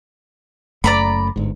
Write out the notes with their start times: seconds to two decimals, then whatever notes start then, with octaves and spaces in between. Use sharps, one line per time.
0.84 F#1 F#2 A3 D5 A#5 B5
1.36 G1 G#2